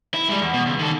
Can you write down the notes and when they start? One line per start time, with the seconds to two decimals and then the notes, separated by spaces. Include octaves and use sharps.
0.14 E4
0.29 G3 G#3
0.41 E2
0.53 B2
0.66 C#2
0.79 D#3 A4